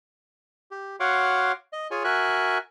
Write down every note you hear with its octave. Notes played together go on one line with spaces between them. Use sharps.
G4
F#4 C#5 F5 F#5 C6 D6
D#5
F4 G#4 C#5 G#5
F#4 A#4 E5 G#5 F#6